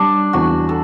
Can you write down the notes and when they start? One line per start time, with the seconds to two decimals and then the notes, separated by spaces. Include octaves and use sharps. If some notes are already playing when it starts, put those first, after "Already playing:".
Already playing: G3 D4
0.33 E2 F#4
0.69 A4